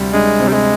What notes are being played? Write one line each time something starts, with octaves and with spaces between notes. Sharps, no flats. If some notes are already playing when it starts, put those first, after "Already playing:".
Already playing: D2 C3 G3
G#3 D4
C3
G3
G#3